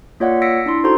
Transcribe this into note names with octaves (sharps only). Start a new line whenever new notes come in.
A#3 F4 C#5 D5 E5 F#5
E6 A#6 B6 C#7 D7
D4 E4 C6
D#4 F#4 A4 C5 A#5 C6